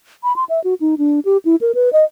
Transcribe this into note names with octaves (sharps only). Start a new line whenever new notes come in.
B5
C6
E5
F#4
D#4
D4
G4
E4
A#4
B4
D#5